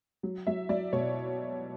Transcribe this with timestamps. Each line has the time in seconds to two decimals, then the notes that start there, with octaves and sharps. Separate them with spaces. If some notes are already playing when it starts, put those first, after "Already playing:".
0.23 F#3
0.47 F#3 E5
0.69 F#3 D5
0.93 B2 C#5